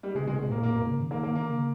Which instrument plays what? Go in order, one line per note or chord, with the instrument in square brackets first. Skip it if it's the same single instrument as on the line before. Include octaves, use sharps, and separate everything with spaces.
[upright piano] G3
[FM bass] C#3 [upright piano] G#3
[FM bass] C3 [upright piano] G#3
[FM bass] C3
[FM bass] A2 [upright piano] A#3
[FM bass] A#2
[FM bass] A2 [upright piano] A#3
[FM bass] G#2
C#3
D#3
[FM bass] D#3 [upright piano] A#3
[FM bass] D#3 [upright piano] A#3
[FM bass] D3 [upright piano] A#3
[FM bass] C#3